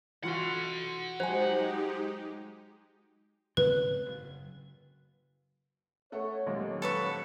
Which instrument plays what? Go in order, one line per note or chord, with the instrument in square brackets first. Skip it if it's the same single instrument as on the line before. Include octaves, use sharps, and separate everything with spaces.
[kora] E3 F4 F#4 [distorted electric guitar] F#5 C6
[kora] F#3 [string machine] G#3 D#4 G4 [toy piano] C5 G#5
[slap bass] G#2 C#3 C4 [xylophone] B4
[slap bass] F#1
[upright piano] A3 A4 F#5 [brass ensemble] C#5
[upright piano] D#1 D#2 [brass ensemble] F#3 [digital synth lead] G#3
[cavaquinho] A4 B4 C#6